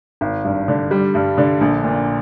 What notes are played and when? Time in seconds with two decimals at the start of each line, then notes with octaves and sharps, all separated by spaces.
0.21 G#1
0.44 G2
0.68 D3
0.91 G3
1.15 G2
1.38 D3
1.61 A#1
1.84 A#2